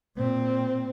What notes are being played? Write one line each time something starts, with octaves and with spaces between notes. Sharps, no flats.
A#2 C4